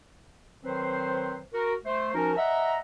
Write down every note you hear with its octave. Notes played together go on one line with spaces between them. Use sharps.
D#3 F#3 C4 B4 C5
F#4 A#4
A3 C5
F3 C#4 D#4 F#4 A#4
D#5 E5 F#5 A#5